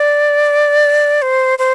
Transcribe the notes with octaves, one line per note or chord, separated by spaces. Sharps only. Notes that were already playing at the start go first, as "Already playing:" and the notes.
Already playing: D5
C5
C5